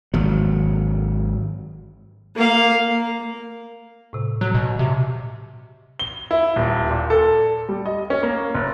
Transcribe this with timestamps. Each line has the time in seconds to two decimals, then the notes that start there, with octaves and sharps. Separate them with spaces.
0.14 G#1 F#3
2.36 A#3 F5
2.89 A#3
4.13 A2 C3
4.41 F#3 F#4
4.54 B2
4.79 C3
5.99 G7
6.31 E4
6.56 D#1
6.90 A#2
7.10 A4
7.69 G3
7.86 D#5
8.10 C#4
8.23 A#3
8.54 F#1